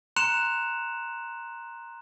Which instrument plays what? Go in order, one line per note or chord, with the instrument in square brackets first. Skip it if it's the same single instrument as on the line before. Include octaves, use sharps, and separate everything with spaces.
[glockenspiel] A#5 C6 F#6 C#7 E7 F7